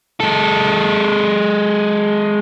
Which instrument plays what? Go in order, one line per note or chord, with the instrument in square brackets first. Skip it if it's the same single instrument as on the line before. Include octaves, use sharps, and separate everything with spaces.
[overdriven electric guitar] G#3 A4